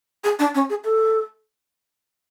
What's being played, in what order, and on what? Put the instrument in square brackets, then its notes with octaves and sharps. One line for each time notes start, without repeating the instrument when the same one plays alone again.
[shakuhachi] G#4
D4
C#4
G#4
A4